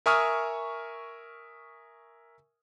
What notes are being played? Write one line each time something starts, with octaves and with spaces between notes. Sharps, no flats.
A#4 E5 G#5 C#6 D#6 F6